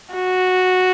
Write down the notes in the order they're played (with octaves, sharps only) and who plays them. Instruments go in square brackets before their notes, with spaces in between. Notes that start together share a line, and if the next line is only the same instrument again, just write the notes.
[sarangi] F#4